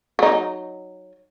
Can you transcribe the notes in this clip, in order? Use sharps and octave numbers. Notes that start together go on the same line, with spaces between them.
F#3 D#4